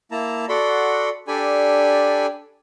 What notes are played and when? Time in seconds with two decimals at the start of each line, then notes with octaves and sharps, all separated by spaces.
0.11 A#3 E4 A5 A#5
0.49 F#4 A4 D5 F#5 B5 C6
1.28 D4 G4 A4 D5 G#5 B5